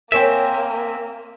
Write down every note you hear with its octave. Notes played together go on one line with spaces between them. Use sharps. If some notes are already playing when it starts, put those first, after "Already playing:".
A#3 C4 A#4 C#5 E5 G5 G#5 B6